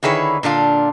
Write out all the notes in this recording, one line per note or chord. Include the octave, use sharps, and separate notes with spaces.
D3 D#3 E4 G#4 B4 C#5
A#2 D3 D4 F4